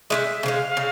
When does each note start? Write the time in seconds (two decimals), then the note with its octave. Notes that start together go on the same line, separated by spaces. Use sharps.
0.10 C#3 E3 G#3 E5
0.43 C#3 E3 F5
0.48 G#3
0.77 C#3